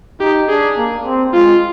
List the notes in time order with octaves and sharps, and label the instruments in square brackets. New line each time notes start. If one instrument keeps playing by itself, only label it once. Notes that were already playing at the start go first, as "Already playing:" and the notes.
[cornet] D#4 [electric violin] G4
[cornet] D4 [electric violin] G#4
[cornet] A#3
C4
[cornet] G#3 [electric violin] F4